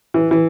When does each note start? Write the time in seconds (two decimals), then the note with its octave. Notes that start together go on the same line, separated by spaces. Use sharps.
0.14 E3
0.31 E3